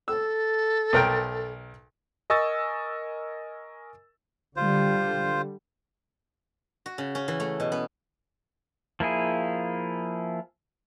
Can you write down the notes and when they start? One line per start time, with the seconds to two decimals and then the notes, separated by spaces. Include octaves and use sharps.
0.08 A4 E6
0.93 B1 A#4 G5
2.30 A#4 D#5 G#5 C#6 E6 A6
4.56 D3 G3 F4 C5
6.86 F#4
6.98 C#3
7.15 C#4
7.28 E3
7.40 A3
7.60 B2
7.72 B3
9.00 F3 A#3 E4 G#4